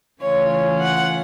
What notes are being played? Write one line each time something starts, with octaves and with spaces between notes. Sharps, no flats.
C#3 E3 A3 C#4 F4 C#5
C#5
F#5